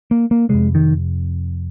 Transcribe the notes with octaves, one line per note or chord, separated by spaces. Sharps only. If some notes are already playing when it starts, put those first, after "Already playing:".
A#3
A#3
F2 C3 G#3
D#3